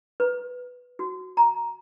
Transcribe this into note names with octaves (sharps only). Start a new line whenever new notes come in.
B4
F#4
A#5